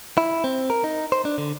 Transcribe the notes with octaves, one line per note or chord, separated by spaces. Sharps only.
E4
C4
A#4
D#4
C5
D4
D3